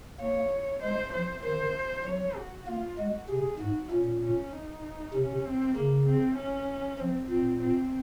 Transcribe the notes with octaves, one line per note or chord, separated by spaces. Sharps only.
A#3 C#5
G#3 C5
F3 C5
D#3 C5
F#3 C#5
F#4
A#3 F4
G#3 F#4
C3 G#4
G#2 F#4
A#2 C#4
C#4
D#4
C3 C#4
C4
C#3 A#3
C4
C#4
F3 C4
A#2 C4
C4